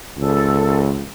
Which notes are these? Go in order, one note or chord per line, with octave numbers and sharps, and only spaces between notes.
C#2 A4